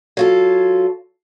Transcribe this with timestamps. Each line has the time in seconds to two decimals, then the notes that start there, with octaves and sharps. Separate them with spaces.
0.17 F#3 F4 A4